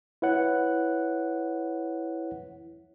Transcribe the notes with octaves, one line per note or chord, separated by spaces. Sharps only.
E4 B4 C#5 F#5